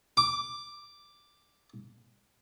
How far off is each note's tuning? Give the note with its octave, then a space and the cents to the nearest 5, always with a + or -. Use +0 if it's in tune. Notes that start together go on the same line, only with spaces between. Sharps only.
D6 +5